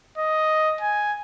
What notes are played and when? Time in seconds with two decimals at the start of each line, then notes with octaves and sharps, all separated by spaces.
0.18 D#5
0.81 G#5